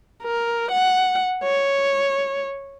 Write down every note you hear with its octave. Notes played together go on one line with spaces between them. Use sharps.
A#4
F#5
C#5